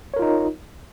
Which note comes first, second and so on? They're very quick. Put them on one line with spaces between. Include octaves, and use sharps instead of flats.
C#5 A#4 F4 D#4